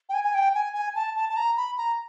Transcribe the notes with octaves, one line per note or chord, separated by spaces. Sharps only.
G5
G#5
G#5
G5
G#5
G#5
A5
A5
A5
A#5
B5
A#5